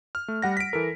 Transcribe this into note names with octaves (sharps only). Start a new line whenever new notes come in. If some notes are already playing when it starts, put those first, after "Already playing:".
F6
A3
G3 F#5 A#6
B6 D7
E3 A4 A#4